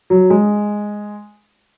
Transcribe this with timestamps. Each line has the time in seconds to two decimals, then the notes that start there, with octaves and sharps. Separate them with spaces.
0.10 F#3
0.30 G#3